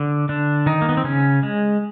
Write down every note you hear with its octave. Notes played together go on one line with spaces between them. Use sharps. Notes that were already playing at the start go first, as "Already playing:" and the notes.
Already playing: D3
D3 D4
D#3 D#4
A#3
B3
C4
C#3 C#4
G#3